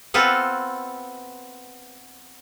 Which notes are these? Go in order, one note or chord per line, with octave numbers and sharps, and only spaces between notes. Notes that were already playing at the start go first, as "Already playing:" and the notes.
B3 C4 F4 A4 B4